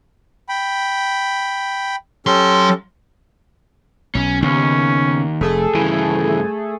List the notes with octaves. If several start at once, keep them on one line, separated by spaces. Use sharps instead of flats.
G5 B5
F#3 C#4 G4 A4 C6
B1 C#4
D#2 C#3 B3 C#4
F1 A3 G#4 A4
G2 C#3 E3 G#5